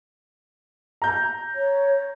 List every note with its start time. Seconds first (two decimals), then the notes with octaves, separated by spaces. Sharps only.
1.02 A#5 G6
1.55 C#5